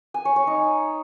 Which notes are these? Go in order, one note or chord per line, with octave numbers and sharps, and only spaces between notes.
G#5
C#5
C#5
D#4